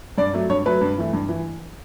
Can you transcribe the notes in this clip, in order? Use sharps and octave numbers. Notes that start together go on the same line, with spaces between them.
G2 D5
F#3 A3
G2 C#5
F#3 A3 B4
G2
E3 A3
G2
E3